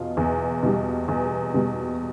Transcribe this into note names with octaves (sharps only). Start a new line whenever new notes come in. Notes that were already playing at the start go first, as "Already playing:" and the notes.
Already playing: E2 B2 F4
E2
B2 G3
E2
B2 G3